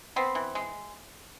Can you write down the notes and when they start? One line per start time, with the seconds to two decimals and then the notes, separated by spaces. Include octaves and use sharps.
0.16 B3 C4
0.35 E3
0.55 G#3